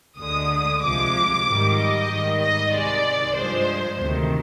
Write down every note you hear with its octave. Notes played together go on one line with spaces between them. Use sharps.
D2 D3 G#3 D#6
C2 C3 F3 G#3 D6
G#2 D#3 G3
D#5
G#2 D#3 G3
D#5
C2 C3 D#3 G#3 D5
G2 F3 G#3 C5
D2 C3 D#3